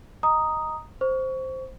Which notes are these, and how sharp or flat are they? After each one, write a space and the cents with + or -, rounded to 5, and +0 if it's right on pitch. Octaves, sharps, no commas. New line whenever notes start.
D#5 +0 A#5 +0 D#6 +0
C5 +0 C#6 +25